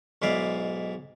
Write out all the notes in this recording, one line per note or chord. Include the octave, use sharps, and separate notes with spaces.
B1 G#2 G#3 E4 D5 F5